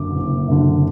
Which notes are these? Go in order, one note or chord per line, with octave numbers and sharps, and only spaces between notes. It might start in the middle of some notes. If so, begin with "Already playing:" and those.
Already playing: F#1 F#2 D3 D6
F#1
F#2 D3